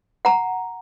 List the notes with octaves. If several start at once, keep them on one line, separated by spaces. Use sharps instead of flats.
F#5 A#5